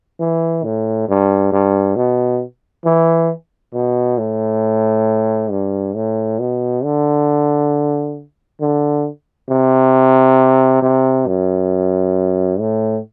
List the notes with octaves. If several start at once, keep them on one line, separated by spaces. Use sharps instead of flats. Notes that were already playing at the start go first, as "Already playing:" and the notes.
E3
A2
G2
G2
B2
E3
B2
A2
G2
A2
B2
D3
D3
C3
C3
F#2
A2